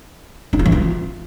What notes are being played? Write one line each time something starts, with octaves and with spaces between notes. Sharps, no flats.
D4
F4
E3
F4